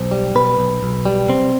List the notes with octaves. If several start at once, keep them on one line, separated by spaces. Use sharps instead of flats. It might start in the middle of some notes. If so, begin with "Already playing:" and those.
Already playing: B1 C5
G3
B2 B4
B1
B1
G3
C3 C4